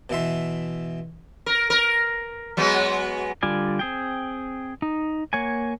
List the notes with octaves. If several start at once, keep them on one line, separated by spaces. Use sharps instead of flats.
B2 E3 E5 C6
A#4
A#4
F#3 G#3 B3
D3 G3 F4 D5 G#5
C4 G#4 G5
D#4
A#3 C#5 F#5 G#5